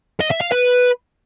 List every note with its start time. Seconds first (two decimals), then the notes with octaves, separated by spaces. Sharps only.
0.21 D#5
0.31 E5
0.41 F5
0.52 B4